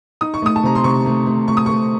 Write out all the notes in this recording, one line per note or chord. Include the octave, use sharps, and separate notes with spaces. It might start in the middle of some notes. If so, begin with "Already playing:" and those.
D#4 D#6
C#6
A3 D#6
A5
C3 A#5
C6
C3 C#6
A3
A3
A3 C#6
D#6
A3 C#6